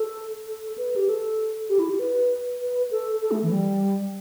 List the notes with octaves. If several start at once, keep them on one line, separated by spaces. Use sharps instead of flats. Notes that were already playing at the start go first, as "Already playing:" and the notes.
Already playing: A4
A4
B4
G4
A4
G4
E4
G4
B4
B4
A4
A4
A3
E3
G3